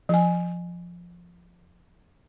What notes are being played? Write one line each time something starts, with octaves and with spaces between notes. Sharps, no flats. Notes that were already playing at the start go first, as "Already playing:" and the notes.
F3 G#5